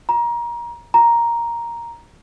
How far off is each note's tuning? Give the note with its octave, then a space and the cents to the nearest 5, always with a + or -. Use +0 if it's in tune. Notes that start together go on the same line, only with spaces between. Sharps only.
A#5 +25
A#5 +5